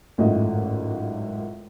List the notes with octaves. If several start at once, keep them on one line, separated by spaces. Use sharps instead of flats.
G#1 F#2 A2 F4 D#5